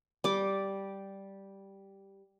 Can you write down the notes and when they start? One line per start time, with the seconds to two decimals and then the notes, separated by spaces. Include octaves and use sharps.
0.24 G3 D5 D6